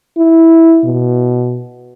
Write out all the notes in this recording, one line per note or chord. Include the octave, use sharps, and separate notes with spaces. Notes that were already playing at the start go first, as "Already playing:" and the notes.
E4
B2